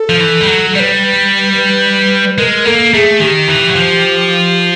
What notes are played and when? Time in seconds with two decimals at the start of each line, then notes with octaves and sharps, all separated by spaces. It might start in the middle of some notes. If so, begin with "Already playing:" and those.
Already playing: A4
0.09 F3
0.20 E3
0.41 G3
0.47 F#3
0.75 G3 D5
0.80 B4
1.56 B4
2.38 G#3 A#4
2.65 A#3 A4
2.94 A3 G#4
3.20 D#3 G4
3.48 E3
3.69 F#3
3.75 F3